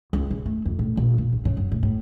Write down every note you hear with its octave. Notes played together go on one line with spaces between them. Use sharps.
C#2
C#3
A3
F2
A2
A#1
A#2
A#1
C#3
F#2
A2
A2